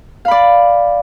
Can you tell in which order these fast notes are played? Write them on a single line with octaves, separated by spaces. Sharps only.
F5 B5 D5